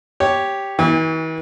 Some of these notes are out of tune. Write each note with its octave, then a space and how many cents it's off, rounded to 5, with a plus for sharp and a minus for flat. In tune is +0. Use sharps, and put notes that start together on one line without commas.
G4 +0 C#5 +0
E3 -45 F#4 +30 G#5 -40